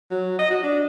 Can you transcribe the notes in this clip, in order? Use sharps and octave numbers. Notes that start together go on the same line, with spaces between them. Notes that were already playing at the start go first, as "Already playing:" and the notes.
F#3
D#5
F#4
D4